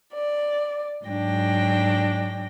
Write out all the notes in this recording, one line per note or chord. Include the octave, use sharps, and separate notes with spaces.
D5
G#2 F#3 D4 G5 A#6